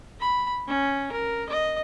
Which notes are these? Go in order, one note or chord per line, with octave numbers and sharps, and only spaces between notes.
B5
C#4
A#4
D#5